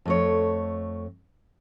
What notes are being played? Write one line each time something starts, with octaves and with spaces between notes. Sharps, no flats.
F2 A3 C#5